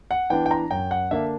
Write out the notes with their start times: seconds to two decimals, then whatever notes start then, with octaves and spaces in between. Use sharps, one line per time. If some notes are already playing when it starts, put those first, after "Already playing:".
0.11 F#5
0.30 E3 B3 D4 G5
0.46 G5
0.51 A#5
0.71 F#2 G5
0.91 F#5
1.11 D3 A#3 D4 E5